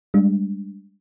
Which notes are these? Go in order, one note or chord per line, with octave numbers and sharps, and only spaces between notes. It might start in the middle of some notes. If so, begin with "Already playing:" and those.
G3 G#3 D4